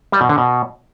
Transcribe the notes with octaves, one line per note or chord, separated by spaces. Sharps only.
G3
B2
D3
B2